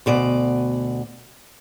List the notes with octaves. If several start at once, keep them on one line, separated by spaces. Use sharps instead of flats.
D2 B2 D5